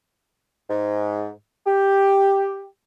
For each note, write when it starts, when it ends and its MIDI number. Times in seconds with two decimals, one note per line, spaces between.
0.69 1.30 44
1.66 2.66 67